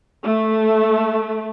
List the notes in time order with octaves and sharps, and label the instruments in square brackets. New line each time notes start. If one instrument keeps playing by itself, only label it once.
[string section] A3